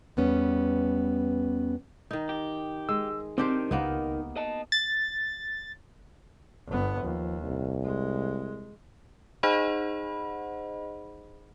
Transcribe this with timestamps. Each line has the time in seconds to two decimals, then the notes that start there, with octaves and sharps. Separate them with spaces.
0.17 E2 G3 B3 C#4
2.11 D#3 D#4
2.29 G4
2.89 G#3 E6
3.38 D#3 C4 D4 G4 C5
3.71 C#2 A#3 B3 D#4
4.36 D#5 A5
4.72 A6
6.67 G1 B3
7.03 D#2 F3
7.43 C2
7.85 G#3
9.43 D#4 G#4 C5 D#5 F#5 B5